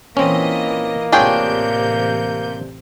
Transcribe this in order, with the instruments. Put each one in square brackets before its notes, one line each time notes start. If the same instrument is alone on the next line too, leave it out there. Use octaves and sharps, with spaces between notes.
[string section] A#2 E3 D#5 [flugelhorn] A#3 [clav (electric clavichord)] C4 C#4
[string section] A1 C3 G6 [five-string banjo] D4 G#4 G5 [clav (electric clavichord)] F4 C#5